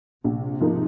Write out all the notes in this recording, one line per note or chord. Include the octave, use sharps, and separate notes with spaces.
A#1 C3
G#2 F3 A#3 D#4